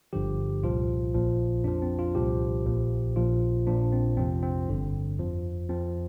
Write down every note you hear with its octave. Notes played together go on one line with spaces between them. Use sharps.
G1 G2 D3 F3 G4
C2 A#2 F3 F4
A#1 A#2 F3
F2 F3 D4
C4
F4
C2 A#2 F3 G4
A#1 A#2 F3
A#1 A#2 F3 F4
A#1 A#2 F3 D4
C4
F2 C3 F3 C4
C4
G1 G2 D3
F2 F3
F2 F3 C4